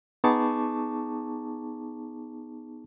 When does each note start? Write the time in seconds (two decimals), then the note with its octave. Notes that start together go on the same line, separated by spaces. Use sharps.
0.24 B3 D#4 G#4 A5 C#6 D6